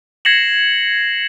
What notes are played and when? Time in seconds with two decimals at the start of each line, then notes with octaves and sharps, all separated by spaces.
0.25 G#6 A#6 C7 C#7 E7 F#7